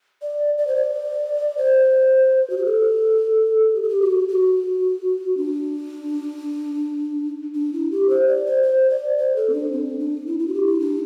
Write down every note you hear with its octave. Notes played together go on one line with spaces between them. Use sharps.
D5
D5
C5
D5
C5
F#4
G4
A4
G4
A4
G4
F#4
F#4
D4
D4
E4
G4
C5
D5
C5
C5
D5
C5
A4
C4
D4
C4
D4
E4
E4
F#4
G4
E4
D4